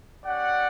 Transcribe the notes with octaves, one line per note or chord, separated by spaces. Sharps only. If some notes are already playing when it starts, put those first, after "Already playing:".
C#4 G4 D5 F#5